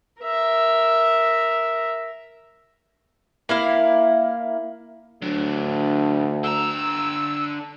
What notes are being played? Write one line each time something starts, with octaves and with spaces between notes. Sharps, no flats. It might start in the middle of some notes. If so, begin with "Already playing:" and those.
A#4 E5
A#3 E4 F5
D2 F#3 D4
D3 A#5 E6